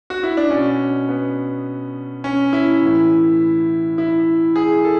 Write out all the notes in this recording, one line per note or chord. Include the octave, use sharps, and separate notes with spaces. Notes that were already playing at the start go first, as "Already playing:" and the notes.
F#4
E4
D4
B2 C#4
B3
C#4
E4
A2 E3
E4
G#4
A4